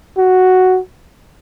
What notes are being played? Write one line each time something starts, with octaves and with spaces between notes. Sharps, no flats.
F#4